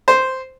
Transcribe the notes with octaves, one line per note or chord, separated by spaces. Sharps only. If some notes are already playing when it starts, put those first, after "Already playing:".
C5